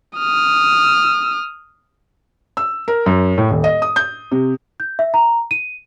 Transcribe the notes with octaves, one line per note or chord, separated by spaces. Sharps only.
D#6 F6
E6
A#4
F#2
A2
D#1
D#5
D#6
G6
C3
G6
E5
A#5
D#7